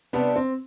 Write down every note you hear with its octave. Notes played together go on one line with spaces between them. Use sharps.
C3 G3 B3 D4
C4